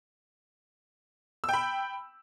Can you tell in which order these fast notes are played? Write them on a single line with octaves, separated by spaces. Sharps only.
E6 G5 B5